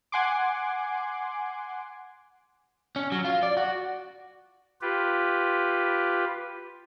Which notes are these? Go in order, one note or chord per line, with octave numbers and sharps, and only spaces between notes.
F#5 G#5 C6 D6
C#4
F#3
F4
D5
F#4
F4 G4 B4